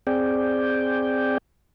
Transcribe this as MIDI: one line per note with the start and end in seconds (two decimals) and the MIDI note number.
0.07 1.38 60
0.07 1.38 68
0.07 1.38 74
0.07 1.38 79